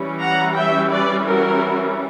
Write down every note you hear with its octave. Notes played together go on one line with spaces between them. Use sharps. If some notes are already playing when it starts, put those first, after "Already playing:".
Already playing: E3 G3 C#4
F#5 A#5
E5 G5
B4 D5
F#4 A#4